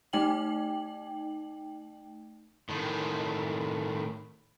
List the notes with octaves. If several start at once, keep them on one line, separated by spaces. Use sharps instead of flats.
A3 D#4 G5 F#7
A2 D#3